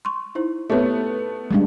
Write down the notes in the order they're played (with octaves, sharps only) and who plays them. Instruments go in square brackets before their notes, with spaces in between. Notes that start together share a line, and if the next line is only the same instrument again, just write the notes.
[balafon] C6 C#6
D#4 E4 C5
[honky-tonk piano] A3 B3 [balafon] G4 C#5 E5
[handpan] G3 G#3 D4